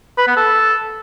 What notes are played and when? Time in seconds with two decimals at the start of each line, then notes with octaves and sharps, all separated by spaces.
0.18 B4
0.27 B3
0.36 A4